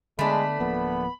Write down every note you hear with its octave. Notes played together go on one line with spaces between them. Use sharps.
D3 G#3 A3 B3 D4 B5
D1 F3 A#3 B3